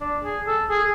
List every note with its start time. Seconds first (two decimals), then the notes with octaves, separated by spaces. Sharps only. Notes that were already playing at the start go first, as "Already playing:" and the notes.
0.01 D4
0.24 G#4
0.47 A4
0.70 G#4